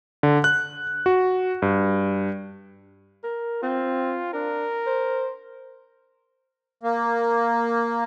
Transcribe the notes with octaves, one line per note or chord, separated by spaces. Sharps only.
D3
F#6
F#4
G2
A#4
C4 F4
D4 A#4
C5
A#3